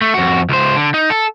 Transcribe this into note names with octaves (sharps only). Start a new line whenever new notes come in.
A3
F2 F#4
C#2 C5
D3
D#4
A4